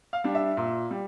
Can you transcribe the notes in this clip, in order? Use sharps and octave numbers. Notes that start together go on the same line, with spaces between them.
F5
G3 D4
E5
A#2
G3